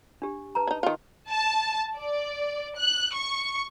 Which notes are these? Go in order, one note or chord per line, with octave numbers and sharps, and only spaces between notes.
D4 G4
B4 A5 A#5
D#4 E4
D#3 F4
A5
D5
F#6
C#6